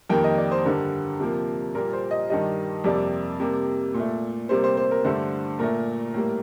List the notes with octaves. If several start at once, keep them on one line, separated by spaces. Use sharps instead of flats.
F2 D#3 G3 A#3 G5
D#5
D5
C5
G2 D3 G3 A#4
C3 F3 A#3
A#2 G3 A#3 A#4
C5
D#5
G2 D#3 G3 D#5
F2 C3 G3 A#3 D5
C3 G3 A#3
A#2
A3
C3 G3 A#3 C5
C5
C5
A#4
G2 D3 A3 C5
A#2 A3 A#4
A2 G3 A#3